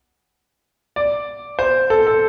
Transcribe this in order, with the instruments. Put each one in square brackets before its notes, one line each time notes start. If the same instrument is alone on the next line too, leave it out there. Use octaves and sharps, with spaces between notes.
[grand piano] D5
C5
A4
A4